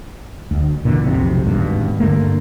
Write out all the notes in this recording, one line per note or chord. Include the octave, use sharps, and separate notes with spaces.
D2
A#2 D3 E3
F1 B1 C3
D1 G#1 G2 B2
G2 D3 A3 A#3